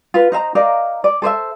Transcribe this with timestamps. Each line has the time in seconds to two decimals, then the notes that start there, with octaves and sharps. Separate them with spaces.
0.14 F4 B4
0.32 D#4 C5 E5 A#5
0.55 D#4 A#4 D5 F5
1.04 D5
1.22 A4 C5 D5 E5